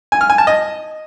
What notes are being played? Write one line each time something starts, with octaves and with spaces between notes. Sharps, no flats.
G#5
F6
G#5
A5
D#5